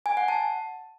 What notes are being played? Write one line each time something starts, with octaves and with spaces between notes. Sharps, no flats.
G#5
F#5
A5